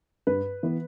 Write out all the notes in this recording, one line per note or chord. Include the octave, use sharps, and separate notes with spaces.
G2 B4
E3 B3